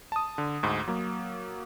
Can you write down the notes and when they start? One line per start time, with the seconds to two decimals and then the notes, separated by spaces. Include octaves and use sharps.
0.12 A5 D#6
0.38 D3
0.63 D2 G#2
0.88 F#3 A#3